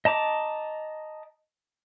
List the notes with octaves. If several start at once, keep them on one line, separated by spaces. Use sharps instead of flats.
D#5 A5 A#5 D6